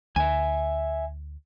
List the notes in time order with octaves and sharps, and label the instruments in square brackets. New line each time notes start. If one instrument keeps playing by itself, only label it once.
[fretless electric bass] D2 [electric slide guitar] E5 G#5